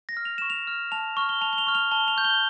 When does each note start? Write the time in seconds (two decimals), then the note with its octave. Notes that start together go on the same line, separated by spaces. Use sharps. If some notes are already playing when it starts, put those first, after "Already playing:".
0.09 A#6
0.17 F6
0.25 F7
0.38 C#6 E7
0.50 F7
0.67 F6
0.92 A5 F7
1.17 C#6 F6
1.29 G7
1.41 A5 F7
1.53 G7
1.58 F7
1.67 C#6 F6
1.75 F7
1.91 A5 G7
2.08 F7
2.17 C#6 G6
2.25 G7